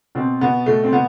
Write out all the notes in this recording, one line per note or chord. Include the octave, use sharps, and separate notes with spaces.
B2 C4
B2 B3
B2 A3
C4
B2 B3